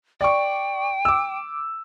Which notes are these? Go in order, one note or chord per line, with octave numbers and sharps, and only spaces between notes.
D5 G5 C#6
D6 E6